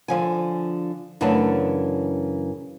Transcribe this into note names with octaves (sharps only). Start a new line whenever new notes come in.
D3 F3 G#5
F#2 C#3 E3 A3 D4 A5